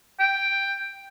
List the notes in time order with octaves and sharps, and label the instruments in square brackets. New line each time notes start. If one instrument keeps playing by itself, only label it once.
[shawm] G5